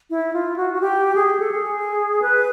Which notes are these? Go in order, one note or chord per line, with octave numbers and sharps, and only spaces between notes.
E4
F4
F#4
F#4
G4
G#4
A4
G#4
B4